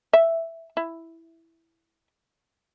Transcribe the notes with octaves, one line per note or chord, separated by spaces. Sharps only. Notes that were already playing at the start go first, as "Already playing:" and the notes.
E5
E4